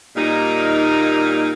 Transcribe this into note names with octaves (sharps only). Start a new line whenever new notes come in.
A#2 G3 A#3 D#4